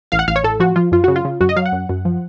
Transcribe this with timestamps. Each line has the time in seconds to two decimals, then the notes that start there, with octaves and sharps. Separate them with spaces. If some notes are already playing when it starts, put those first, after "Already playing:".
0.12 A1 F5
0.19 F#5
0.28 A1 F5
0.36 C#5
0.44 A2 A4
0.60 F3 F#4
0.76 F3 F4
0.92 F#2 F4
1.04 C#3 F#4
1.16 F4
1.25 C#3
1.41 F#2 F#4
1.49 D#5
1.56 F#3 F5
1.66 F#5
1.72 F#2
1.89 F#2
2.05 F3